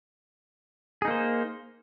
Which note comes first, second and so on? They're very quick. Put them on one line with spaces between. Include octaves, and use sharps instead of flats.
G#4 D#4 A#3 C5